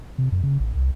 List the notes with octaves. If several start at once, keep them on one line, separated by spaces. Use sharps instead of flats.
C3
F#2
C#3
A1
C2